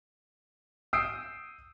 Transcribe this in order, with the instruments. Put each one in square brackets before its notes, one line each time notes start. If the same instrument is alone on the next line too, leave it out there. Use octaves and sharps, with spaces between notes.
[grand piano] D#6 E6 G6 C7 D7 D#7